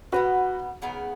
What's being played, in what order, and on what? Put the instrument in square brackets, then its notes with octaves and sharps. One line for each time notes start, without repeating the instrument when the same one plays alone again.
[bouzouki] B2 B3 D#4 [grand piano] F#4 B4
[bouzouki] C#3 B3 D#4 G#4